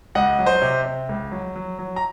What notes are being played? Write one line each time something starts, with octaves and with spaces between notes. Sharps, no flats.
C#2 D#5 F#5
F#3
C5 D#5
C3
C3
C#2
F#3
F#3
F#3
A#5